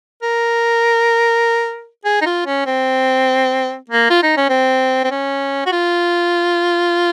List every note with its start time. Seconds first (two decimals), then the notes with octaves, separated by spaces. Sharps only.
0.22 A#4
2.05 G#4
2.21 D#4
2.26 F4
2.46 C#4
2.66 C4
3.89 A#3
4.10 F4
4.23 D#4
4.37 C#4
4.49 C4
5.04 C4
5.11 C#4
5.66 F#4
5.72 F4